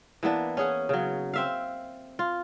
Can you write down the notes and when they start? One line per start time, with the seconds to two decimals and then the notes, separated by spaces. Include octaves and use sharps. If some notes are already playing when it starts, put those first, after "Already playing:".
0.23 E3 A#3 B3 D4
0.57 C#4 G#4 F#5
0.89 C#3 F#3
1.34 C4 E5 F5
2.19 F4